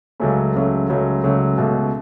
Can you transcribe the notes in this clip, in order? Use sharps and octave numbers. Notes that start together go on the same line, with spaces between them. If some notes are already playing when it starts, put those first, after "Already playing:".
C#2 C#3 F#3 A3 C#4
C#2 C#3 F#3 A3
C#2 C#3 F#3 A3
C#2 C#3 F#3 A3
C#2 B2 A3